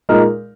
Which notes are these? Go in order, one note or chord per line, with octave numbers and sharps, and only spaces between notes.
A#2 G#3 D#4 A#4